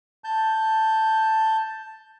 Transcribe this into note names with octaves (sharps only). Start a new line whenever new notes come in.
A5 G6